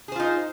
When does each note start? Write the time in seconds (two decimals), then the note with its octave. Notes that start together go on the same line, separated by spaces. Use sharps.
0.08 G#4
0.12 C5
0.16 F4
0.20 D#4